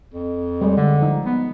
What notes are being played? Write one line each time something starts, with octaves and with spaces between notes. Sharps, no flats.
F2
G3 G#3
D3
F3 D#4
B3